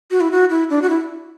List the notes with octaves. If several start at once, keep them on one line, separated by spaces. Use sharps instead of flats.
F#4
E4
F#4
E4
D4
F#4
E4